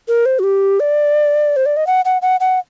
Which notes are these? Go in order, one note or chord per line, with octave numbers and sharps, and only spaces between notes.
A#4
C5
F#4
G4
D5
C5
D5
D#5
F#5
F#5
F#5
F#5